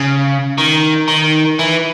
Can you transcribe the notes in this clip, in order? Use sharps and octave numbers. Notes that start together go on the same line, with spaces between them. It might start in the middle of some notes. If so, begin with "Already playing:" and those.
Already playing: C#3
D#3
D#3
E3